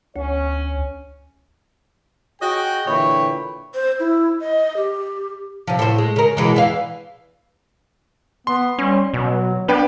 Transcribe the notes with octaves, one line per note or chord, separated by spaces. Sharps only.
D2 C#4 C#5
F#4 G#4 C#5 D#5 G5
A#2 D3 E3 C#5 G5 B5
C5
E4
D#5
G4
C3 F3
A2 C5
G#3
C#3 A#4
B2 E3 G#3
E2 E3 F5
B3 C6
G3 C#4
B2 F#3
B3 D4 B4 G5